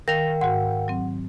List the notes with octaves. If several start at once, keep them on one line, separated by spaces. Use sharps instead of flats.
D#3 A#4 F5 G5 A#6 F7
G#2 F#4 F#5
F#3 C4